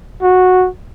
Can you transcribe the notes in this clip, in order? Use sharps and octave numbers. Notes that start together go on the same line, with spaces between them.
F#4